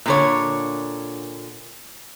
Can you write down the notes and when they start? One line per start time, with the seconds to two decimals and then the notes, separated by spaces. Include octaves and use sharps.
0.06 A#2 D3 C#5